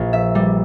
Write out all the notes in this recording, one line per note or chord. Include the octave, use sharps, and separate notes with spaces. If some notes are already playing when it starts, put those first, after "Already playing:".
Already playing: A#1
E5
G3